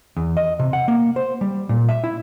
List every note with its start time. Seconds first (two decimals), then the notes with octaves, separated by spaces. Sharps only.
0.17 E2
0.37 D#5
0.59 C3
0.73 F#5
0.88 A#3
1.16 C5
1.41 G3
1.69 A#2
1.89 E5
2.04 E4